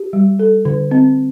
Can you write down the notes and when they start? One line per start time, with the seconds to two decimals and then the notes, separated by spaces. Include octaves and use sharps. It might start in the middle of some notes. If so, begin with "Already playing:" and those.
Already playing: G4
0.13 G3
0.39 A4
0.65 D3
0.91 C4